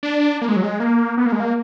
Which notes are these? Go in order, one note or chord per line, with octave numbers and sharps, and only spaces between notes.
D4
A#3
G#3
F#3
G#3
A#3
B3
A#3
G#3
A#3